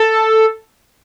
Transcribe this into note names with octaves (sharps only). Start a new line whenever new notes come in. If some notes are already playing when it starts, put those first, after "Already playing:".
Already playing: A4